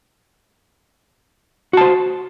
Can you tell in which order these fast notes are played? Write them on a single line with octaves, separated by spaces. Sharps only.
F#4 A5 C5